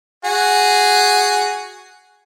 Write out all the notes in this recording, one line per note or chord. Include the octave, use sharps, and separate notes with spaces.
F#4 G#4